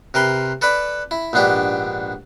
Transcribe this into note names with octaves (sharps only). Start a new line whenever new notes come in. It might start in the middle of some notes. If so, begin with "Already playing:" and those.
C3 A#4 B4 C6
A4 B4 D5 B5
E4
A#1 G#2 B3 D4 G4